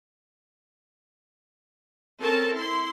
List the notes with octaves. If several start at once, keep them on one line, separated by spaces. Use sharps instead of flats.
C4 C#4 A4 A#4 A5
E4 C6